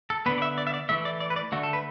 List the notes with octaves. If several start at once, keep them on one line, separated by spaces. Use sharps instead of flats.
A4
D3 B3 B4
D5
E5
D5
E5
D5
E3 A3 E5
D5
D5
B4
D5
D3 A3 F#4
A4
B4